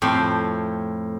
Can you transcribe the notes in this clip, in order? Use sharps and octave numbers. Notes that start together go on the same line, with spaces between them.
F2 A2 G5